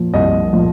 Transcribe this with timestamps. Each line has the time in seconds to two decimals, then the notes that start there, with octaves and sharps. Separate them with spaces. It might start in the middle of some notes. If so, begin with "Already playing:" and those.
Already playing: A#2 F3
0.14 C2 D#5
0.53 A#2 F3